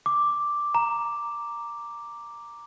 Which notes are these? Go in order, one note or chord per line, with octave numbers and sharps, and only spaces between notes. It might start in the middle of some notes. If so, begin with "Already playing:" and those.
D6
A#5